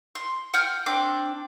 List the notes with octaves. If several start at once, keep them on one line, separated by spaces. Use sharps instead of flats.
C6
F#5 G5 F6 G6
C4 D4 G5 D6